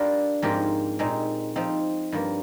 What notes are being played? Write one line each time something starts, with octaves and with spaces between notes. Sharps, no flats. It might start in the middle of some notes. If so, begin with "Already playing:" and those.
Already playing: G3 D4 F4 A#4
G#2 F3 C4 G4 A#4
A#2 G#3 C4 D#4
F3 C4 D#4
G2 F3 A#3